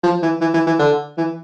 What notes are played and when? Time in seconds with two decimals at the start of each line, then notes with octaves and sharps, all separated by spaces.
0.03 F3
0.22 E3
0.41 E3
0.54 E3
0.67 E3
0.79 D3
1.17 E3